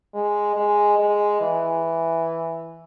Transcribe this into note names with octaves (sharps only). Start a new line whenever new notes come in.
G#3
G#3
G#3
E3